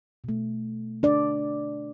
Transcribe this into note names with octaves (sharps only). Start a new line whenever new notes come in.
B2 A3
D4 D5